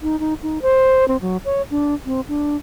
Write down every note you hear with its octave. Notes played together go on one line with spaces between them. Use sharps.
D#4
D#4
D#4
C5
C4
F#3
C#5
D4
C4
D4